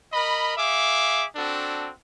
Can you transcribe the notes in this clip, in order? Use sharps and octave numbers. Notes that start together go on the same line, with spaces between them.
A#4 D#5 B5
G#4 E5 F5 D6
C4 D4 F#4 A4